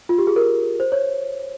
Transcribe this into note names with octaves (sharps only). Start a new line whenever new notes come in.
F4
G4
G#4
A#4
C5
C#5